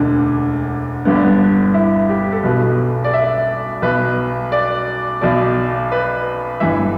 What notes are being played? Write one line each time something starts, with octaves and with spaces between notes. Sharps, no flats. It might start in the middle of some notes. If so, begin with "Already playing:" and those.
Already playing: E1 D2 D3 D4
G1 G2 D3 B3
D4
B3
E4
G4
A4
B1 B2 B4
D5
E5
B1 B2 B4
D5
B1 B2 D5
B4
G1 G2 E3 E5